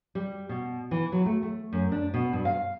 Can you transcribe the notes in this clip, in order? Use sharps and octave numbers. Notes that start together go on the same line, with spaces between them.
G3
B2
E3
F#3
A3
A3
F#2
D4
B2
G2
F5